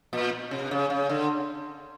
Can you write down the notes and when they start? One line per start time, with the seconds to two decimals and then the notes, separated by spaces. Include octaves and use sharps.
0.13 A#2
0.51 C3
0.71 C#3
0.90 C#3
1.09 D3